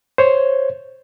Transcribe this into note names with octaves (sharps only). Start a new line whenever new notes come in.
C5 C#5